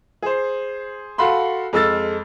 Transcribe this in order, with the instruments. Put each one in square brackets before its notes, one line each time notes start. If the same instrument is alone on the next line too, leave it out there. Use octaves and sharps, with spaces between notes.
[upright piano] G#4 C5
F#4 A4 F5 B5 C6
F2 G#3 A4 E6 F6 A6